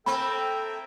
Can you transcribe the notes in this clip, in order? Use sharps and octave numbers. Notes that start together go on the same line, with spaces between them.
A#3 C4 A4 E5 G5 B5